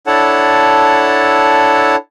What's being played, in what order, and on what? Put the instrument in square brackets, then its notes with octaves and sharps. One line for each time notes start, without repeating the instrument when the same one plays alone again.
[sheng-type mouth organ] D4 E4 A4 C#5 F#5 A5